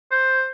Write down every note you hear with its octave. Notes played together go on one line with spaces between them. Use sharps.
C5